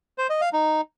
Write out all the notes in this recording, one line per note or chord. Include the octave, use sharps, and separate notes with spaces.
C5
D#5
F5
D#4